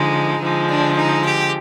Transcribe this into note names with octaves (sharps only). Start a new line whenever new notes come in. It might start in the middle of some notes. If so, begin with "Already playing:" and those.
Already playing: D3 F3 G#3 D#4
D3 F3 G#3
D4
D#4
G4